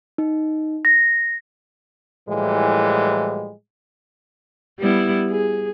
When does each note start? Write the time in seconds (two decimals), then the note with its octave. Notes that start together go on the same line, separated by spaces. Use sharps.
0.18 D#4
0.85 A#6
2.28 A2 E3 F3 G3 G#3
4.79 G3 B3 E4
5.29 G#4